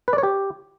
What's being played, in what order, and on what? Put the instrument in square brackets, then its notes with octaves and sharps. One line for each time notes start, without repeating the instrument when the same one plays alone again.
[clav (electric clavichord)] B4
D5
C#5
G4